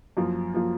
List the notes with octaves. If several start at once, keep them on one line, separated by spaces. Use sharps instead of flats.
F#2 F3 A#3 F4
F3 A#3 F4